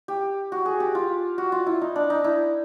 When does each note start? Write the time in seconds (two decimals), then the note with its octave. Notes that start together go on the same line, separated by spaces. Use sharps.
0.08 G4
0.52 F#4
0.66 G#4
0.80 G4
0.95 F4
1.38 F#4
1.52 F4
1.66 E4
1.81 D#4
1.96 D4
2.10 D#4
2.24 E4